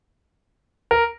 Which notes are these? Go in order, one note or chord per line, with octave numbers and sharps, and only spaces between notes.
A#4